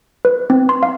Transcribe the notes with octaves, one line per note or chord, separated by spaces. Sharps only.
B4
C4
C6
F5